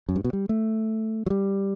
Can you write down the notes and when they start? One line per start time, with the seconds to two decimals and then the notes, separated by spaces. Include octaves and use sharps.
0.09 F#2
0.16 G2
0.24 B2
0.33 G3
0.49 A3
1.26 F#3
1.30 G3